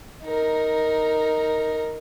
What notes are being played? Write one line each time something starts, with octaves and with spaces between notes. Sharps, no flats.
D#4 A#4